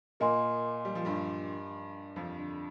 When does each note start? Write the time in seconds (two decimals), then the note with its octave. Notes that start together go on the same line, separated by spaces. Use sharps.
0.20 A#2 A#3 A#4 D#5 G#5 C6
0.85 G3
0.95 F3
1.05 G2 G3
2.16 F2 F3
2.38 D3